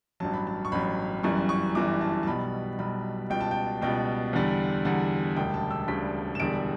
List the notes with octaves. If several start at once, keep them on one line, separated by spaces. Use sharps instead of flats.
A1 G2 F#3 A5
B5
A5
C#6
A1 G2 F#3 B5
G1 F#2 E3 G3 C#6
C#6
G1 F#2 E3 G3 D6
A5
A5
B1 B2 G3 B5
B1 B2 G3 B5
C#2 B2 G3 G5
A5
G5
C#2 B2 G3 G5
E2 D3 G3
E2 D3 G3 F#5
E1 D2 C#3 G3 G5
A5
E6
E1 D2 C#3 G3 B6
E7
E1 E2 D3 G3 D7